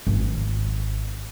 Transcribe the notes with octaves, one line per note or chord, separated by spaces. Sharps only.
G#1